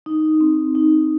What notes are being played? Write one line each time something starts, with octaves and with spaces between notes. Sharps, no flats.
D#4
C4
D#4